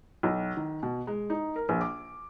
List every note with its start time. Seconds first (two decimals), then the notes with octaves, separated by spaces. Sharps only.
0.23 B1
0.57 D#3
0.83 B2
1.07 G#3
1.30 D#4
1.56 A#4
1.69 A#1
1.81 D6